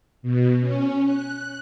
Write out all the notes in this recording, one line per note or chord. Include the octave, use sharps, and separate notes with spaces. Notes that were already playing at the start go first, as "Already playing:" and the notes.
B2
C#4
F#6